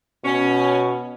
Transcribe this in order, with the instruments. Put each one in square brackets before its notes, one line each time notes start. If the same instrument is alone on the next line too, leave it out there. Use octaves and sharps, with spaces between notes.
[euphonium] B2 [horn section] C#4